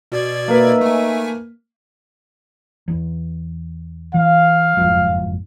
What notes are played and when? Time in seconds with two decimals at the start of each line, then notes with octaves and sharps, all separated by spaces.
0.12 B2 D5 G#6
0.48 A#3 D#4 B4 E5
0.81 A3 G#5
2.88 E2
4.14 E3 F5
4.77 F#1 F2 G#2